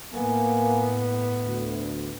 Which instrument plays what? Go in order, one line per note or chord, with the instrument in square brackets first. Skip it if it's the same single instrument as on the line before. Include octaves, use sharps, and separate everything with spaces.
[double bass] A2 B3 [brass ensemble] A#3 G#5
[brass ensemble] D2